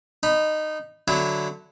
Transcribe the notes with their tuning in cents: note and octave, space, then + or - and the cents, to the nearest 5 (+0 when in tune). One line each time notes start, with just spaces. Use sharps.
D#4 -15 B5 +0
D3 +0 F#3 +0 E4 +0